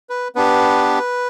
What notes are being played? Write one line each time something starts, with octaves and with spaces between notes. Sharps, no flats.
B4
B3 D4 G4 B4